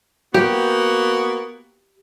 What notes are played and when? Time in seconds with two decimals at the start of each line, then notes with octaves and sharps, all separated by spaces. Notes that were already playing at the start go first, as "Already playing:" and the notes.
0.34 A#3 B3 F#4 G4